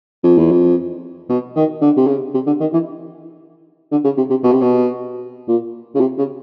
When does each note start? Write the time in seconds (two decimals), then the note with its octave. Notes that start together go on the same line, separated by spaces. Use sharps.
0.24 F2
0.37 E2
0.51 F2
1.29 B2
1.56 D#3
1.81 D3
1.97 C3
2.07 C#3
2.34 C3
2.47 D3
2.61 D#3
2.73 E3
3.92 D3
4.04 C#3
4.17 C3
4.30 C3
4.44 B2
4.52 C3
4.62 B2
5.48 A#2
5.95 C#3
6.00 C3
6.18 C#3